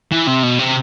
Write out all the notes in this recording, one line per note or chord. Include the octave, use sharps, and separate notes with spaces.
E3
C3
B2
C3